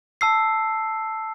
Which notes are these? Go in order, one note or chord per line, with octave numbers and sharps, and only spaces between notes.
A5 E6 C7